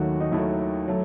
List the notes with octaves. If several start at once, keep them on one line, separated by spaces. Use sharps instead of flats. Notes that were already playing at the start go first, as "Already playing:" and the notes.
Already playing: D#2 D#3 F#3 A3 F#4
D#4
D#2 D#3 F#3 A3 E4
F#3 A3